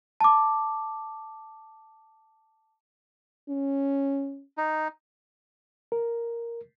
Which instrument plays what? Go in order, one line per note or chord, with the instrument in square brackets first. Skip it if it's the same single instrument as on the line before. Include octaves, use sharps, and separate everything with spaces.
[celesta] A5 D6
[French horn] C#4
[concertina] D#4
[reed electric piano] A#4